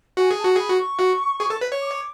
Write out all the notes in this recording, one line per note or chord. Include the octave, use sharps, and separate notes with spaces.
F#4 G#5
G#4
A5
F#4
G#4 B5
F#4
C#6
F#4
G#4
A4
B4
C#5
D6